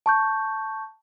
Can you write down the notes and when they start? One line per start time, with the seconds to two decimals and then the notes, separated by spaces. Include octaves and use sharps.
0.06 A5 C#6 G6